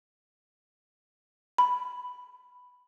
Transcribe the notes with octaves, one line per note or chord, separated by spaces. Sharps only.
B5